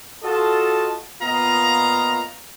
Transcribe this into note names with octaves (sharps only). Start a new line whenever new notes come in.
F4 F#4 A4 D#5 A5
A#2 B3 F4 D#5 F5 A#5